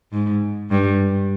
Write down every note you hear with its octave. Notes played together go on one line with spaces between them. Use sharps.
G#2
G2